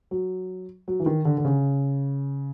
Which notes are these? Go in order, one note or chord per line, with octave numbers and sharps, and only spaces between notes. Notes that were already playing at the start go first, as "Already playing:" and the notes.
F#3
F#3
E3
D#3
D3
D3
C#3